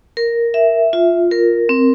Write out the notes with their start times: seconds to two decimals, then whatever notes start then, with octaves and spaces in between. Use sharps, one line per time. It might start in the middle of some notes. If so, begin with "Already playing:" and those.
0.17 A#4
0.54 E5
0.93 F4
1.31 A#4
1.69 C4